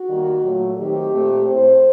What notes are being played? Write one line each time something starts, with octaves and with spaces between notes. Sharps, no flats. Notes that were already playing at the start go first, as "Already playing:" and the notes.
Already playing: F#4
D#3 G3 A#3
A#2 F#3 A3
D#3 F#3 A3 C4 G4
A#2 A3 C4
A2 A3 C4 C5